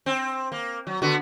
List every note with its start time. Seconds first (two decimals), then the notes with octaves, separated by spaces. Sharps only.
0.06 C4
0.52 A#3
0.87 F#3
1.02 D3 B3 F#4